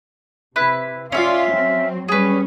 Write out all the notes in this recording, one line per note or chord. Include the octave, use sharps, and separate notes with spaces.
C3 E4 B4 F#6
C#4 F4 D5 E5 F5
F#3 C4
G3 C#4 G#4 B4